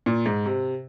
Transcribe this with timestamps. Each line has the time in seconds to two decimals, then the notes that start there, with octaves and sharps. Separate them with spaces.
0.06 A#2
0.26 G#2
0.46 C3